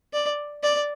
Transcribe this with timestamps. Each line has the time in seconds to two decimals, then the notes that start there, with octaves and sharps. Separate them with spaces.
0.13 D5
0.63 D5